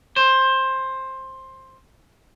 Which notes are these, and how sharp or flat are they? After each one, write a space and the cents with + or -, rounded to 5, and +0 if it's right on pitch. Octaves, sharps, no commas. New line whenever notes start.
C5 +15